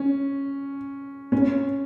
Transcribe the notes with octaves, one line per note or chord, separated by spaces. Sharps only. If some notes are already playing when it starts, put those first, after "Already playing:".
Already playing: C#4
C#4